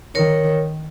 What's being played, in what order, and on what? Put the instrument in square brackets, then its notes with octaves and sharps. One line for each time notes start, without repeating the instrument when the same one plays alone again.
[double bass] D#3 [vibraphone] A#4 C#5